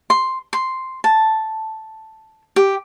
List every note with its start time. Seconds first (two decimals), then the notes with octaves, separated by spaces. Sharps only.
0.10 C6
0.53 C6
1.04 A5
2.56 G4